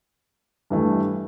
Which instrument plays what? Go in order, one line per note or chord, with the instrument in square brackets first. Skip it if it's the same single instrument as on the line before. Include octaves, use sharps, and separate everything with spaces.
[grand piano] G2 E3 A3